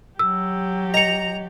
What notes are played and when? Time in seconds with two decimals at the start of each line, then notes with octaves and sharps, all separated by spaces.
0.19 F#3 G4 E6
0.94 D#5 A#5 C#7